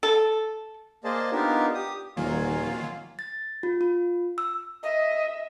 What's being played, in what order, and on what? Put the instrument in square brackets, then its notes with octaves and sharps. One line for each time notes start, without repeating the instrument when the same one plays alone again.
[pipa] A4
[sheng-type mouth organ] A#3 G#4 C5 D5 D#5 A5
B3 D4 D#4 F4 G4 A#4
G4 D#6
[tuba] D#1 [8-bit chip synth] D#3 F#3 A#3 [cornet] F4 [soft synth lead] G#5
[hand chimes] A6
F4
F4
E6
[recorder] D#5 [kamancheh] E5